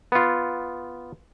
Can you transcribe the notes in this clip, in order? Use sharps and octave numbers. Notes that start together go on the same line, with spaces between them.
B3 F4